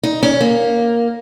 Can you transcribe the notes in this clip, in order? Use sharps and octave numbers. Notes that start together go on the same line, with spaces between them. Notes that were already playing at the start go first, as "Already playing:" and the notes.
D#4
C#4
A#3